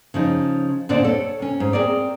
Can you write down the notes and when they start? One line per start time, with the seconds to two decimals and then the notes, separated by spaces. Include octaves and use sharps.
0.14 C#3 F3 D#4
0.89 D2 A#2 C4 D4 D5
1.04 A4 C#5
1.39 C3 C#4
1.60 G#2
1.73 C4 G#4 A#4 D5